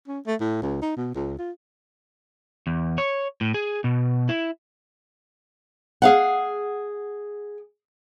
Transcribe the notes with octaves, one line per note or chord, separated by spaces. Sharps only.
C#4
A3
A2
C#2
D#4
B2
C#2
F4
E2
C#5
A2
G#4
B2
E4
G#4 F5 F#5